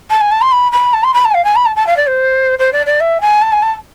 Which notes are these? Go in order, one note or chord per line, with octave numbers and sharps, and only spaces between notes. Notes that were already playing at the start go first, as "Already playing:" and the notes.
A5
G#5
A5
C6
B5
B5
A5
C6
B5
A5
G#5
F5
G#5
B5
A5
A5
F5
D5
C5
C5
D5
D5
E5
G#5
A5
G#5
A5